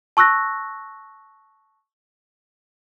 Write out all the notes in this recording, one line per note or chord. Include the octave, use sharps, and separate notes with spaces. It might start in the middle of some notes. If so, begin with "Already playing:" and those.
A5 C#6 E6 F#6 A#6